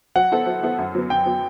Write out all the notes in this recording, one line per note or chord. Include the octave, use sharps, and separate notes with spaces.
F#3 F#5
B3 E4 A4 C5
F#3
B3 E4 A4 C5
F#2
F#3 B3
F#2 G5
F#3 B3